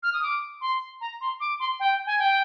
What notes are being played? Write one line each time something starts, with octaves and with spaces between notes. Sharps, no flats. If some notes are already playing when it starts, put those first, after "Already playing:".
F6
D#6
D6
C6
A#5
C6
D6
C6
G5
G#5
G5